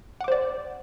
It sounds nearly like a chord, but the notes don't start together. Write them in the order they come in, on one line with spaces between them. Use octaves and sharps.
F#5 D6 C5 D5